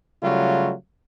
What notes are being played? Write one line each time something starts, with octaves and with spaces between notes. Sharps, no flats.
C#3 F#3 G3 A3 F4